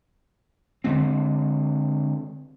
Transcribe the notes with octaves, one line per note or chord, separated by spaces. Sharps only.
D3 D#3 G#3 C4